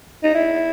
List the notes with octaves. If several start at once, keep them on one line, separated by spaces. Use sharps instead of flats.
D#4
E4